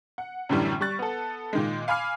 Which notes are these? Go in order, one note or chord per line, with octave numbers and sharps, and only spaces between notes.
F#5
F#2 A2 D3 E3 G3
G3 C#6 F#6 A6
B3 A4
A#2 D#3 G#3
F5 G#5 B5 D6 F6 C7